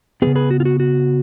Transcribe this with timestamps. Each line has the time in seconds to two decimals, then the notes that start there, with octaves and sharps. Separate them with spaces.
0.22 C#3 F3 B3 G#4 B4
0.35 G#4 B4
0.51 F#4
0.60 F4
0.65 F#4
0.80 F#4